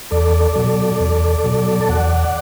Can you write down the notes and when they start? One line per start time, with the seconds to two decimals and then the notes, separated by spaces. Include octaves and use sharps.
0.11 E2 A4 D5
0.56 B2 F#3
1.00 E2
1.44 B2 F#3
1.81 A5
1.89 E2 D5 F#5